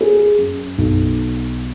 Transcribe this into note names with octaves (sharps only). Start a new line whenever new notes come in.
G#4
F#2
B1